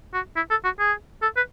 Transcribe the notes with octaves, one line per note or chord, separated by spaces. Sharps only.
F#4
E4
A4
F#4
G#4
A4
B4